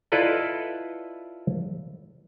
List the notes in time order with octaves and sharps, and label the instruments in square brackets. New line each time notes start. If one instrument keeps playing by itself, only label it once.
[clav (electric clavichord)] E4 F4 A4 B4 D5 D#5